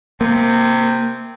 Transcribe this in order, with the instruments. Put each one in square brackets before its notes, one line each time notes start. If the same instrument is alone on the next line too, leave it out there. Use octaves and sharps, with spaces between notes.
[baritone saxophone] C3 [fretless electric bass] A#3